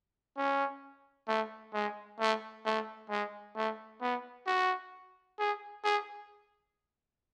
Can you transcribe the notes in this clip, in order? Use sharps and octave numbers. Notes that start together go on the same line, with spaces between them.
C#4
A3
G#3
A3
A3
G#3
A3
B3
F#4
G#4
G#4